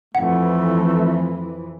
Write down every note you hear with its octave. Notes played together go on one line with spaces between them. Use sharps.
F2 E3 A3 F#5